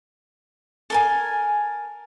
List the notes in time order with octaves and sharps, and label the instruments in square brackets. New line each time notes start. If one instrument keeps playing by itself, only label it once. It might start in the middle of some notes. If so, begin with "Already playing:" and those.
[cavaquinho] A4 A#4 G#5